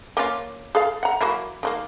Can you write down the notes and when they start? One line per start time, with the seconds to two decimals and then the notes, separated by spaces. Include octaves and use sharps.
0.17 A#3 C#4 F4
0.75 G#4 A4 F5
1.03 F#5 A#5
1.21 F#3 A#3 E4
1.63 D#3 G3 A#3